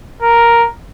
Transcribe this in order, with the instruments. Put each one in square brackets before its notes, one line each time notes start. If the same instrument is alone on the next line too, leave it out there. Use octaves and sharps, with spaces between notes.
[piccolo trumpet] A#4